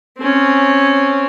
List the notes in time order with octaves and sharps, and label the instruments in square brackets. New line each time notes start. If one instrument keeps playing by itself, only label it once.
[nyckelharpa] C4 C#4